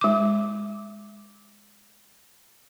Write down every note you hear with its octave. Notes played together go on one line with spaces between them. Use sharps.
G#3 D6